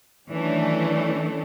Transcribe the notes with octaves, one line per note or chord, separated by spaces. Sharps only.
D#3 E3 F#3 A3 C#4 D4